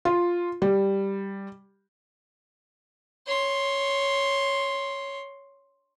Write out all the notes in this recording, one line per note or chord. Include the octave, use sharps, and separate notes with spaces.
F4
G3
C#5 C6